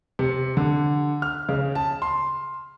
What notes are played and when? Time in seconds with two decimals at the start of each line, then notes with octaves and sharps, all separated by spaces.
0.19 C3
0.57 D3
1.22 F6
1.49 C#3
1.75 A5
2.02 C6